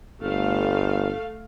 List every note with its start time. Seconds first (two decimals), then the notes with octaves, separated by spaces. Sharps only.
0.22 G1 A3 F5